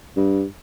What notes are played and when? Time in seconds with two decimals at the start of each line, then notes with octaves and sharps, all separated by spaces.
0.17 G2